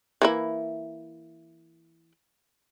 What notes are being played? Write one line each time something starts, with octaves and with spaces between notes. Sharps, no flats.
E3 A#3 E4